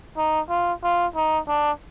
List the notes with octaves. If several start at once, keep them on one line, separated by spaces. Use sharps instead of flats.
D#4
F4
F4
D#4
D4